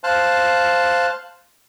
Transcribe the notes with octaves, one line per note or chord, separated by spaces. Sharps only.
C5 F5 A5 F#6